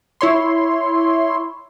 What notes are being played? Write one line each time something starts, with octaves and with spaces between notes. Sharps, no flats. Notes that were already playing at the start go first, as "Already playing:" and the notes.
E4 C#5 C6